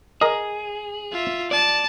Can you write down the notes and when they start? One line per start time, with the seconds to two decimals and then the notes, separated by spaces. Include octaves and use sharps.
0.21 G#4 A#4 D#5
1.12 F4 E5
1.51 D5 A5